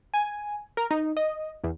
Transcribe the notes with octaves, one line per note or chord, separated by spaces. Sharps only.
G#5
A#4
D#4
D#5
E2